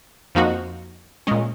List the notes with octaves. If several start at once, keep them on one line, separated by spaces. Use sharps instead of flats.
F2 F3 A#3 D#4 F#4
A#2 G#3 C#4